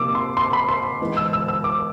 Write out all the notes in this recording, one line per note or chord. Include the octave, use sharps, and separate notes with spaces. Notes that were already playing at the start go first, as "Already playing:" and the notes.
Already playing: C3 F3 A#3 D#4 D6 E6
C6
C6
B5
C6
E3 G#3 B3 D#4
E6
E6
E6
D6